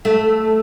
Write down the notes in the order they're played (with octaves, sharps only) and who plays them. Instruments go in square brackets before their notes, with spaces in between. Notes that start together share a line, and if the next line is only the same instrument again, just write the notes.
[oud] A3